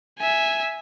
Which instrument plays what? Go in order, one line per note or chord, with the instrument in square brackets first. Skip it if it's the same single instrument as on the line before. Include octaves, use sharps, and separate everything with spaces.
[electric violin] E5 G#5